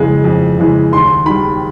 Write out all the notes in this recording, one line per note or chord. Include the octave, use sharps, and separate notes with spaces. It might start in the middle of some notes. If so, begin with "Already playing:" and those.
Already playing: F2 C#3 E3 G#3
F2
C#3 E3 G#3
D#2 C6
D#3 G3 B5